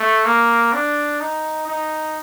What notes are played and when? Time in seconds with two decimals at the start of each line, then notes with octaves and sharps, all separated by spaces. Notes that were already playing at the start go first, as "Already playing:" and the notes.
Already playing: A3
0.25 A#3
0.73 D4
1.20 D#4
1.68 D#4